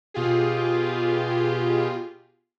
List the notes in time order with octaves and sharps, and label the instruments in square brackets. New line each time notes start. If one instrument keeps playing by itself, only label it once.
[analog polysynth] B2 F4 G4 G#4